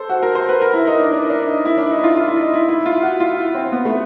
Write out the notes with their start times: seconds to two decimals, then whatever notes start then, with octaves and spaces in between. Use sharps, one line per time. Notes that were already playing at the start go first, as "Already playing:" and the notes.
Already playing: A4 C5
0.09 F#4
0.23 A#4
0.35 C5
0.49 B4
0.62 A#4
0.74 E4
0.87 D#4
1.00 D4
1.13 D4
1.30 D4
1.48 D#4
1.65 E4
1.78 D4
1.91 D#4
1.99 E4
2.04 F4
2.16 F4
2.28 E4
2.41 D#4
2.54 E4
2.69 E4
2.86 F4
3.02 F#4
3.20 F4
3.37 E4
3.55 C4
3.72 B3
3.85 A3